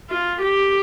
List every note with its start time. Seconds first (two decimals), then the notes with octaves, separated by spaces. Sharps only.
0.10 F4
0.42 G4